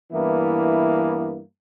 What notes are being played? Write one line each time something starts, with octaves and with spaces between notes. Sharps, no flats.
G2 E3 A#3 B3 E4